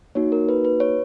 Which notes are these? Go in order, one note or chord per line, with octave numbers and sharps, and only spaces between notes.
A#3 D#4 F#4 C#5
A#4
B4
B4
C#5